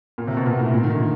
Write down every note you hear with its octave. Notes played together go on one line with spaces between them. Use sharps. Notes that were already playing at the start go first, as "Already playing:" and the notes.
A#2
C3
B2
A#2
A2
A#2
D#3
D3